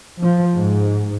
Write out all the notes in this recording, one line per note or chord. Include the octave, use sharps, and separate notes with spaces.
F3
G#2